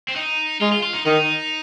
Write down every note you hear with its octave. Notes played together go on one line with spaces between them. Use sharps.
C4
D#4
G#3 F4
F4
F4
D#4
D#3 D#4